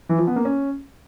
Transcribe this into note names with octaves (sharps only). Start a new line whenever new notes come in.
E3
F3
B3
A#3
C#4